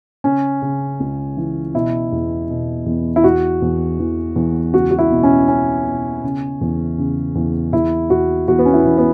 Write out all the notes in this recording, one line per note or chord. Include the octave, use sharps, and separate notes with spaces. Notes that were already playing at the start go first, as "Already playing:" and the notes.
C#3 C#4
C#3
C#2
E3
B2 E4
E2
B2
E2
E4
E2 F#4
E2
E3
E2
C#2 F#4
F#4
E4
B2
C#4
B2 C#4
B2
C#3
E2
C#3
E2
E2 E4
E2 F#4
E2 F#4
B3
C#4
E4
E3
B3